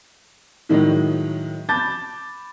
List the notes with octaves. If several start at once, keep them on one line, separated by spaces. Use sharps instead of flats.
A2 D#3 F#3 G#3
A5 B5 D6 G6 A6